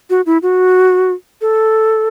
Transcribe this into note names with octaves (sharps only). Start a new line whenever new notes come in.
F#4
E4
F#4
A4